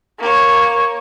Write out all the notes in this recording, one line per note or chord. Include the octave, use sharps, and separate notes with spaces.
A#3 C#5